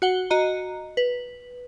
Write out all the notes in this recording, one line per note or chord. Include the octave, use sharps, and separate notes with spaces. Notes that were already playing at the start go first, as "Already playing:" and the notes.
F#4 F#5 G7
F#4 D#5 A#5
B4